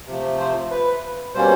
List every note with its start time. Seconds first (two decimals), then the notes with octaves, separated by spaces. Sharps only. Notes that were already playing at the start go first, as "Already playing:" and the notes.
0.07 C3 F3 A3
0.39 C5
0.71 B4
1.34 B2 G3 A#3 C#4 C5